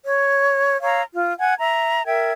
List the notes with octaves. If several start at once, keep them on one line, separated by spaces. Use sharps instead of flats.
C#5
C#5 F5 A#5 E6
F4
F#5 G#5 G#6
E5 A#5
A#4 E5 G5 G#6